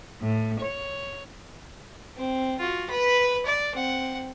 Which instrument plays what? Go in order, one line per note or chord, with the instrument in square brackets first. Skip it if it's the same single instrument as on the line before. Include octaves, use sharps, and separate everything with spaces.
[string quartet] A2
C#5
[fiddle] C4
F4 F#4
B4 B5
D5
C4 F#5